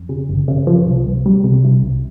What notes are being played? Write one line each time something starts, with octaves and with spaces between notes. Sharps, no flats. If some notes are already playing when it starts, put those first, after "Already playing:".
Already playing: F2
C#3
G1
C#3
F3
C2
C2
G3
C3
C3
C2